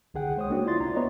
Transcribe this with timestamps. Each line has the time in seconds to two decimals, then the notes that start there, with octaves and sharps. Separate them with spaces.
0.14 C2 D3 G#4 F#5 G5
0.37 G#3 C5 C#5 D#6
0.50 A#3 D4 F#4
0.66 E4 F4 D5 C6 A6
0.81 C2 A#5
0.96 B3 C#5 D#5